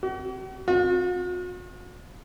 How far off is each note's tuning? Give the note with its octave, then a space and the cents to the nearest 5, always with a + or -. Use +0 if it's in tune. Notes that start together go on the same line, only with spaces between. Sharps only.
F#4 +45
F#4 -45